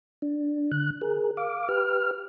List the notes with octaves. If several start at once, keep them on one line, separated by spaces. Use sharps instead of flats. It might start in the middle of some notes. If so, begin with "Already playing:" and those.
D4
D3 F#6
G#4 A#4
F5 D6
G4 B4 F6